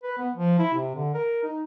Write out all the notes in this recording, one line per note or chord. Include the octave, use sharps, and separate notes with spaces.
B4
B3
F3
E4
C3
D3
A#4
D#4